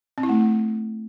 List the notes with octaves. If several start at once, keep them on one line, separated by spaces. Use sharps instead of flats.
C4
E4
A3